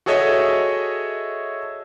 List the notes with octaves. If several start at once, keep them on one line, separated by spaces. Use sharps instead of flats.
F#4 G#4 A4 C#5 D#5 E5